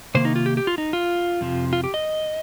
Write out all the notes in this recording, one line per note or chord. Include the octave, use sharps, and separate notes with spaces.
C3 D#3 A#3 C5
D#4
F4
G4
G4
F4
D#4
F4
F2 C3 F3
F4
G4
D#5